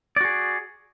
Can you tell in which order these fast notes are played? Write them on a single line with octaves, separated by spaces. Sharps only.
D5 F#4 G#4